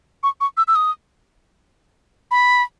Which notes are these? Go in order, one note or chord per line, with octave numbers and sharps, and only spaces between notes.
C#6
C#6
E6
E6
D#6
B5